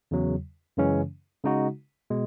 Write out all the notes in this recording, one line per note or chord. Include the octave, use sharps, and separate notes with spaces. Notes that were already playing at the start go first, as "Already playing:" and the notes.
E2 C#3 F#3
F#2 C#3 E3 G#3 C#4
C#3 G#3 D#4 F#4
B2 G#3